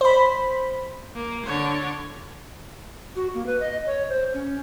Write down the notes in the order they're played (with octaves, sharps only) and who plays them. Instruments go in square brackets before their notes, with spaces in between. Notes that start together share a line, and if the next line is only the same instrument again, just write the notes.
[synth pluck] C5 B5
[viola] A#3
D3 C#5
[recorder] F#4
A#3
B4
D#5
C#5
C5
C#4